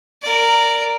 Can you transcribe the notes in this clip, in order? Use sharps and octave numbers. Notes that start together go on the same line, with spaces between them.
A#4 D5